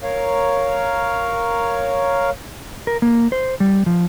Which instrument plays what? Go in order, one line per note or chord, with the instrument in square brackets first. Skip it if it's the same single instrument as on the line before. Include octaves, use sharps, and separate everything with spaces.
[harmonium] A#4 C#5 F5
[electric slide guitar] A#4
A#3
C5
G3
F3